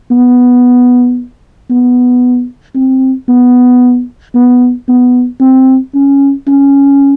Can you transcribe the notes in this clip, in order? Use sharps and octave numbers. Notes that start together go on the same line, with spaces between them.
B3
B3
C4
B3
B3
B3
C4
C#4
C#4